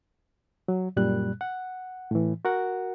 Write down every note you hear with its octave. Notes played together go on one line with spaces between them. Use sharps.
F#3
F#2 A#2 G3 F#6
F#5
A2 E3
F#4 A#4 F#5